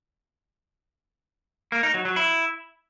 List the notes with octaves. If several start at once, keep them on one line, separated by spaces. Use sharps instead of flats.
A#3
D#4
F#3
F#3
E4